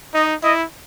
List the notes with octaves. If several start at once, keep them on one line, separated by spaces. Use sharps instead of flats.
D#4 D#5
E4 D#5